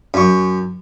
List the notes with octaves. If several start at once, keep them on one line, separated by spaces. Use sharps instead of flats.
F#2 C#6